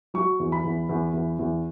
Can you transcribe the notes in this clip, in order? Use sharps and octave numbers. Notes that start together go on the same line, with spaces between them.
F#3 C#6
E2
B5
E2
E2
E2
E2